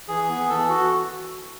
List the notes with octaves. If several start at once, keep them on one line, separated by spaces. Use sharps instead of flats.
E3 G#4
B3
E3 A4
F#4